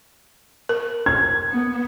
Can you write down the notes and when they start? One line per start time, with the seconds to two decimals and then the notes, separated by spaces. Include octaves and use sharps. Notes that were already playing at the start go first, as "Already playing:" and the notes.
0.69 A#4
1.06 G#6
1.51 B3